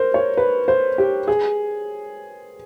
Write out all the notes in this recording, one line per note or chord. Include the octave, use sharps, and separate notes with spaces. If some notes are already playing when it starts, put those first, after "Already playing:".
Already playing: A#4 C5
C#5
B4
C5
G4
G#4